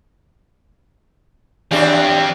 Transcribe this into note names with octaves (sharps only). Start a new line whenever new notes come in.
D#2 F3 C4 D4 G4